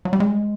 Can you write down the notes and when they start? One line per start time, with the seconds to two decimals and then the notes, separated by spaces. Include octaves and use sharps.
0.05 F#3
0.13 G3
0.20 G#3